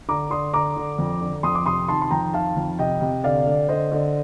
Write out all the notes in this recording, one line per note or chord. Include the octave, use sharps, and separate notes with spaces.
D3 A#5 D6
D3 C6 D#6
D3 A#5 D6
D3
F2
D3
F2 C6 D#6
D6
C3 C6 D#6
D#3 A5 C6
C6
F2 G5 A#5
D#3 F5 A5
F2
C3 D#5 G5
C3
D3 D5 F5
D3
D3 C5 D#5
D3